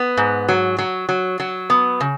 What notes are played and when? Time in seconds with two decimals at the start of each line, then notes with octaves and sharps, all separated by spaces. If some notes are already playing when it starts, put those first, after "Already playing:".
Already playing: B3
0.17 G#2
0.49 F#3
0.78 F#3
1.09 F#3
1.40 F#3
1.70 B3
2.00 C#3